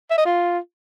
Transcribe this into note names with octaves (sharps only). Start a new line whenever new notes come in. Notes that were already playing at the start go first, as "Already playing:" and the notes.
E5
D#5
F4